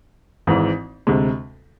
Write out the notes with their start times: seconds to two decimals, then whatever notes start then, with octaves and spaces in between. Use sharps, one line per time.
0.47 G#1 G#2 E3
1.07 D2 C3 G#3